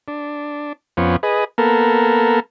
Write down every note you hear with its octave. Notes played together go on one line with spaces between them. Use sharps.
D4
F2 F3 B3 C#4
G#4 B4 D#5
A#3 B3 A4 A#4